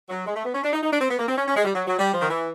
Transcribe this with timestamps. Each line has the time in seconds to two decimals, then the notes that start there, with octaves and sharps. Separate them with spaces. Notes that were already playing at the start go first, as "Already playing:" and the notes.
0.09 F#3
0.26 G#3
0.35 A3
0.45 B3
0.54 C#4
0.63 D4
0.72 D#4
0.83 D#4
0.91 D4
1.01 C4
1.09 B3
1.19 A#3
1.28 C4
1.38 C#4
1.48 C#4
1.56 G#3
1.65 G3
1.74 F#3
1.87 F#3
1.99 G3
2.12 F3
2.22 D#3
2.30 E3